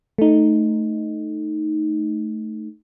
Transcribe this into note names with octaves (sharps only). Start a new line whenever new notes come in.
A3 D#4